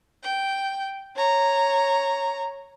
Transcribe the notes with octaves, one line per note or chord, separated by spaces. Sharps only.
G5
C#5 A#5